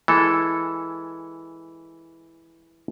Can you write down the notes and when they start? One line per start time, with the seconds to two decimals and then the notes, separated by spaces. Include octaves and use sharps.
0.08 E3 G#3 A4